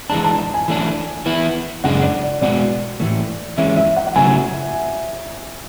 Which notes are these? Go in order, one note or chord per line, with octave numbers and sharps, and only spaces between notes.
E3 G#3 D4 A5
A5
A5
G#5
E3 A3 D4
E3 B3 E4
F#2 C#3 G#3 D4 F#5
D5
D5
B2 G#3 B3 F#4 D5
A2 E3 A3
E3 G#3 C#4 E5
E5
F#5
F#5
C#3 F#3 A3 G#5